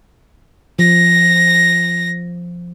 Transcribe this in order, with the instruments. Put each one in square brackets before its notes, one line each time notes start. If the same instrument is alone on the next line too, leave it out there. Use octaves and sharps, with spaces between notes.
[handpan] F3 [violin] A#6